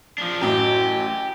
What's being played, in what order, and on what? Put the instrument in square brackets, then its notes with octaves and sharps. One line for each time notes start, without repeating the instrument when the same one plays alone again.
[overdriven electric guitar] F3 D4
[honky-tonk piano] A1 F#2 [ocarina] F#4 [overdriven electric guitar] G4